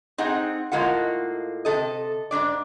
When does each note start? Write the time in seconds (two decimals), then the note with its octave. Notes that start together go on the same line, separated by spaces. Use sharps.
0.18 C4 D#4 G#4 F#5
0.72 A2 G#3 A#3 F4 F#5
1.65 C3 A4 D#5
2.31 G#2 C3 D4 D5